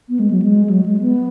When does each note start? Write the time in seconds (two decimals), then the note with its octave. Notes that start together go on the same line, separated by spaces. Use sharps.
0.09 B3
0.19 G#3
0.31 F#3
0.42 G#3
0.66 G#3
0.70 F#3
0.86 G#3
1.01 B3